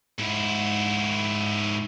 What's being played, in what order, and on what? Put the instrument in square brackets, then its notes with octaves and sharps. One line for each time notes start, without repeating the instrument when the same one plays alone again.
[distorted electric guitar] G#2 E4